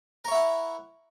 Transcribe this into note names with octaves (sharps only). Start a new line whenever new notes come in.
E4 A#4 C#5 F#5